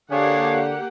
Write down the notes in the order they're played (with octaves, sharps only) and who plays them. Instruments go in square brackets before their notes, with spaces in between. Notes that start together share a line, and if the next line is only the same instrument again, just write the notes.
[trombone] D3 [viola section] A#3 G4 F#5 [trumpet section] D4 G#4 C#5 [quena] F5